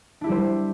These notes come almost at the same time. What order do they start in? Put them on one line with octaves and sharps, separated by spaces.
D4 E4 G4 G3 C5